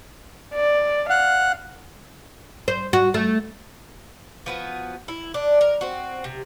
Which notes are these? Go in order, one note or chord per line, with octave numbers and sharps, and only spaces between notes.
D5
F5 F#5
C5
F#4
A3
F3 B3 F#4
E4
D4
A#4
C4 F#4
C3